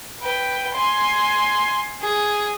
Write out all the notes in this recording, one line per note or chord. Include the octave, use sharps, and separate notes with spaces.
B4 G5
G#5 C6
G#4